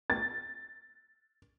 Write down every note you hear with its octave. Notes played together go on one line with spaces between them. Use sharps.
A6